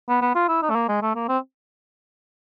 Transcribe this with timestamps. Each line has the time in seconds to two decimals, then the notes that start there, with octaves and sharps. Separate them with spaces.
0.09 B3
0.22 B3
0.35 F4
0.48 E4
0.62 D#4
0.70 A3
0.75 A#3
0.89 G#3
1.02 A3
1.15 A#3
1.28 C4